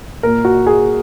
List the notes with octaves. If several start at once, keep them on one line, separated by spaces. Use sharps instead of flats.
A#2 A#3 A#4
F#4
G#4